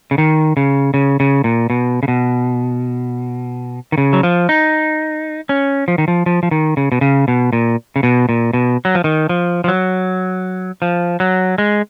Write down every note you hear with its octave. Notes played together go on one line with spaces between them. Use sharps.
C#3
D#3
C#3
C#3
C#3
A#2
B2
C#3
B2
D#3
C#3
F#3
F3
D#4
C#4
F3
D#3
F3
F3
F3
D#3
C#3
B2
C#3
B2
A#2
C#3
B2
A#2
B2
F#3
F3
D#3
F3
F3
F#3
F3
F#3
G#3